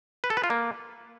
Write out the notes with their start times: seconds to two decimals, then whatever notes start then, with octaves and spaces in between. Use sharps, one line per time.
0.24 B4
0.30 A4
0.37 B4
0.44 F4
0.50 A#3